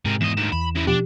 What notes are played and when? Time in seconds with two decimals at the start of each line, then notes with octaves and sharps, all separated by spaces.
0.05 G#2 C3 A#4
0.21 E2 D#5 E7
0.37 D2 D#3 E7
0.53 E2 B5
0.76 C#3 E4
0.87 B2 F3 D4 G4